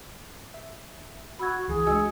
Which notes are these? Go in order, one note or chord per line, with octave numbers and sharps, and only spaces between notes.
E5
F#4 B5 E6 G#6
C#2 E3 G#4
G#3 D4 F#4 D#5 G#5 E6